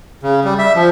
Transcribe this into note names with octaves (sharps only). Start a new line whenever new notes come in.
C#3
G3
E5
F3